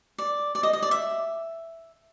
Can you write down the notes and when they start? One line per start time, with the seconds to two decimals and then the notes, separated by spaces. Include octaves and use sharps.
0.18 D5
0.55 D5
0.63 D#5
0.73 D#5
0.82 D5
0.91 E5